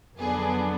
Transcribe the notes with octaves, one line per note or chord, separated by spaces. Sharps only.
F2 D3 F#3 B3 D4 G#4